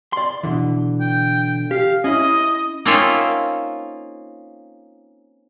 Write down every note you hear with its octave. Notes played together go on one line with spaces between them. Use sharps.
D5 C6
B2 D3 E3
G5
G4 F5
C#4 E4 D#5
A#3 C4 C#4 D#4 F4 E5